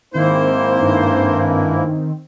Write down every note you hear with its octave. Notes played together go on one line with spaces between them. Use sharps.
G#2 D#3 A#3 C4 E4 C5
G2